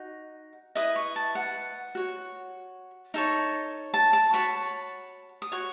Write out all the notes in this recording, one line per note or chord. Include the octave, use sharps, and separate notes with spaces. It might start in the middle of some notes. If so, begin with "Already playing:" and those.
Already playing: D#4 F#4
E4 B4 D#5 D#6
C#6
A5
F#5
F#4 C#5
D#4 A4 C#5
A5
A5
F#4 C#5 B5
D#6
F#4 C#5 C#6